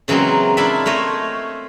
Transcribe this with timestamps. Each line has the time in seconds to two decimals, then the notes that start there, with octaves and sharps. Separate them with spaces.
0.08 C#3 E3 F#3 G#3 A#3 C4
0.57 D4 E4 F4 D5 E5
0.86 A3 C5 C#5 D#5